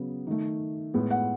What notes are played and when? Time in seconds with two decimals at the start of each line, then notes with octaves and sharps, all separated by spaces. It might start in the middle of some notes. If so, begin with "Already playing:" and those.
Already playing: C#3 F#3 B3
0.27 D#3 A3
0.94 A2 G#3 B3
1.11 F#5